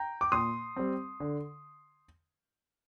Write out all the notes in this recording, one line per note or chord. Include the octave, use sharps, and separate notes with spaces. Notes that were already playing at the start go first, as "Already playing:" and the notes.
Already playing: G5 A#5
D6
A#2 C6 D#6
G3 C4
D3